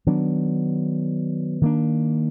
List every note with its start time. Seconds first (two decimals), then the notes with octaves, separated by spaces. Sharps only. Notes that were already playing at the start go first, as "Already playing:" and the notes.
0.06 D#3 F#3 B3 D4
1.61 D#3 A#3 D4